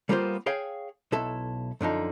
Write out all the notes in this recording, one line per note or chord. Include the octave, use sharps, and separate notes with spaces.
G3 A#3 B3 F4 A#4 C5
G#4 C#5 F5 G5
B1 E4 A4
F#2 D3 F3 D#4